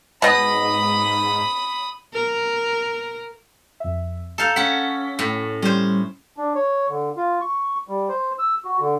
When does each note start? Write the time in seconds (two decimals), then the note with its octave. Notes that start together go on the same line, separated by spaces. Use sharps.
0.22 G#2 B2 D#5 B5 D#6
2.14 A#4
3.80 F2 E5
4.38 A4 F5 A5 A#5 G6
4.56 C#4 F#5 B6
5.19 A2
5.62 G3 C#4 C5
6.38 D4
6.55 C#5
6.89 D3
7.17 F4
7.41 C#6
7.88 G3
8.09 C5
8.39 E6
8.65 F#4
8.80 D3